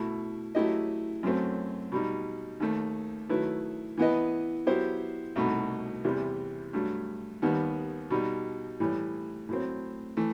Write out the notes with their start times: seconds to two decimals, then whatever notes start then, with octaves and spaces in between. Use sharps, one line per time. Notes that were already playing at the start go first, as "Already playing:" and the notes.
Already playing: B2 A3 E4
0.55 F#3 A3 E4 G4 D#5
1.23 F#2 F#3 A3 C4
1.92 B2 G3 D#4
2.60 D#2 D#3 A3
3.29 D#3 F#3 A3 E4 B4
3.97 E3 B3 E4 B4 D#5
4.67 F#3 B3 E4 G4 C5
5.36 C2 B2 A3 D#4 F#4
6.04 E2 C3 E3 G3
6.73 G2 F#3 A3
7.42 D#2 D#3 G3 B3
8.10 B2 G3 D#4
8.80 A2 E3 G3
9.49 A2 F#3 C4
10.17 E3 A3